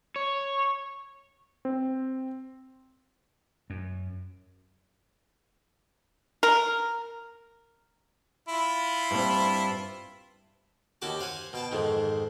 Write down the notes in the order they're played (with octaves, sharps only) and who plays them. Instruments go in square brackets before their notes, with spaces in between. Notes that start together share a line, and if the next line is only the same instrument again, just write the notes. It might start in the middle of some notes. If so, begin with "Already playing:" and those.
[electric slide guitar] C#5
[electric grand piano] C4
[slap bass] F#2
[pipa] A#4
[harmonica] E4 F4
[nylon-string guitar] G2 C4
[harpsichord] D#2 C#4 F#4 G4 A5 D6
C5 F5 F#5 G#5
B2 G5 A5
F2 G#2 D#3 F3